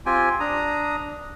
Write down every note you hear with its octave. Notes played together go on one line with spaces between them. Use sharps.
C4 F4 G4 G5 G#5
D4 A#5 D#6